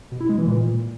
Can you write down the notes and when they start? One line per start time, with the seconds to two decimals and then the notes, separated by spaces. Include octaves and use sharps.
0.12 B2
0.21 E4
0.29 G#3
0.38 E3
0.47 A#2